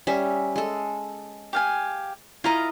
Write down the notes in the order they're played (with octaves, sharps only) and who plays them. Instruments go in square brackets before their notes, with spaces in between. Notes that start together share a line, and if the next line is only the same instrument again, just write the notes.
[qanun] G3 C#4 E5
G#3 A4
[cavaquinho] G4 F5 G#5
[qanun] E4 A#4 D#5 [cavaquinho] F4 A#5